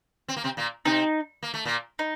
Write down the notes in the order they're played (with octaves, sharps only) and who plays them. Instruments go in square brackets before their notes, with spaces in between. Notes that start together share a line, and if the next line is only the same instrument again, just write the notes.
[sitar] C4
A#3
C3 C4
A#2 A#3
[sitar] C3 C4 [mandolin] D#4
[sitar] A#3
A3
A#2 A#3
[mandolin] D#4